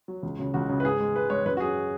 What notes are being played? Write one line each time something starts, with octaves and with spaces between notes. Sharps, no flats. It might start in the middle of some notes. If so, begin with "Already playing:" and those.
F#3
C#2
C#3 F#3
C#2 F#4
C#3 F#3
B4
G#2 G#4
G#3
G#2 B4
G#3 C#5
F#2 B4
F#4
F#3 G#4